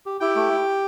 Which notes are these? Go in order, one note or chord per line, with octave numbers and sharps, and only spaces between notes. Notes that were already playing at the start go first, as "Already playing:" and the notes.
G4
E4 G4 G5
A3